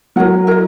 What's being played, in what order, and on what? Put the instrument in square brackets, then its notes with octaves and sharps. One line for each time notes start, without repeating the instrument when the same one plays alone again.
[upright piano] F#3 [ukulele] A#4 C#5 F#5
[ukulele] E4 A#4 D#5